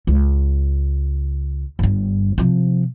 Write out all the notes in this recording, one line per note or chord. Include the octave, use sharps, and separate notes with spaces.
C#2
G1 G2
C3 F3